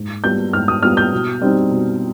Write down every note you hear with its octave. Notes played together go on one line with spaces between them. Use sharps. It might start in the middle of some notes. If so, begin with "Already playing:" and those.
Already playing: G#2
G3 B3 F4 G6
G#2 F6
D#6
G3 B3 F4 F6
G6
B2
G3 C4 D#4
B2